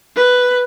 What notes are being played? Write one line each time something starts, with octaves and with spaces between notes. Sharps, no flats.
B4